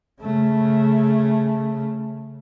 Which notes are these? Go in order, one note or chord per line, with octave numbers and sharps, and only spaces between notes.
C#3 A3